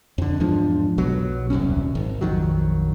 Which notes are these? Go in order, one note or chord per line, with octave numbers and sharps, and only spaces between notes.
F2 D3
E2 G#2 F3 D4
B1 B2 F#3
D#1 C2 F#2 C#4
G#1
A#1 F2 D#3 F#3